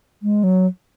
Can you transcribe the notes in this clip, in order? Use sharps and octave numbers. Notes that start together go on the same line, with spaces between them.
G#3
F#3